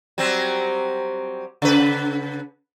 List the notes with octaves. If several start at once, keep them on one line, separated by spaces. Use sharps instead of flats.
F#3 G3 C4
C#3 B4